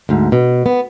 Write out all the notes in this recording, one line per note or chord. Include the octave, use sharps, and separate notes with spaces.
D2 G#2
B2
B3